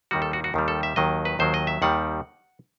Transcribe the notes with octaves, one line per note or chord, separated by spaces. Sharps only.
D#2 D#3 G3 F#4
A4
F#4
F#4
D#2 D#3 G3
A4
E5
D#2 D#3 F#3 D#5
B4
D#2 D#3 F#3 C5
D#5
E5
D#2 D#3 G3 F#5